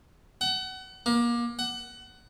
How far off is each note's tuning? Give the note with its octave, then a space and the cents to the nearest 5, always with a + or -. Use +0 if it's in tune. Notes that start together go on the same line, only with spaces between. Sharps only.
F#5 +30
A#3 +30
F#5 +20